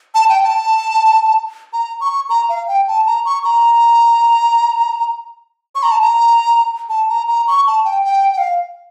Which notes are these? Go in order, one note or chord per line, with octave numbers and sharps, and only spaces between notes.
A5
G5
A5
A#5
C#6
A#5
F5
G5
A5
A#5
C#6
A#5
C#6
A#5
A5
A#5
A5
A#5
A#5
C#6
A5
G5
G5
G5
F5